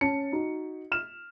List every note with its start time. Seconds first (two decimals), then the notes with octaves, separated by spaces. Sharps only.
0.01 C#4 A5 C#7
0.32 D#4 F#4
0.92 F6 E7